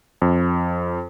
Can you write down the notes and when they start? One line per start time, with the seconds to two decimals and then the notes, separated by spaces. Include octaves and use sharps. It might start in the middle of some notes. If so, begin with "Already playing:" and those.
0.22 F2